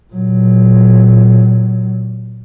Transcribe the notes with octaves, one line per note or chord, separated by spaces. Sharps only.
A#2 F#3